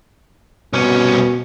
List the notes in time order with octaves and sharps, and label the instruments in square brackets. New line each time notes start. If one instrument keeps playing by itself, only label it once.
[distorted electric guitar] C2 C#4 [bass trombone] B2